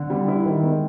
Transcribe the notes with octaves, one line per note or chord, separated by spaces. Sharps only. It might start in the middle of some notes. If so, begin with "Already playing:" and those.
Already playing: D3
G3
E4
D#3
G#3